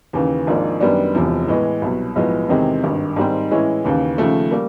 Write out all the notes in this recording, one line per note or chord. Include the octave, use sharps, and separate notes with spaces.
D#2 C#3 E3
G#1 G#2 F3 A#3 D4
F#2 D#3 G3 B3 D4
E1 E2 C3 F3
A2 E3 G#3 B3
C2 B2 F#3
B1 A2 F3 G#3 B3
E2 C3 D#3 G#3 C4
G#1 G2 D#3
G#2 D#3 G3 C4
A2 E3 G#3 C#4 E4
D#2 C#3 E3
D#2 C#3 F3 A3
G3 A#3